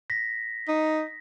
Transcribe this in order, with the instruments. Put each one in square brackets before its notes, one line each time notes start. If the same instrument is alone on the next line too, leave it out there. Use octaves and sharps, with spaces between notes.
[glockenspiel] A#6 B6
[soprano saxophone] D#4